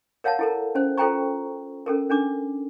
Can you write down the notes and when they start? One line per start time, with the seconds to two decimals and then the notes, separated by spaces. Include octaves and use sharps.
0.24 A#4 C#5 F5 F#5 A5
0.39 E4 A4 A#4
0.75 C#4 C5
0.97 F4 A4 C5 G5 A#5 C#6
1.86 C#4 A4 A#4
2.10 C#4 D4 D6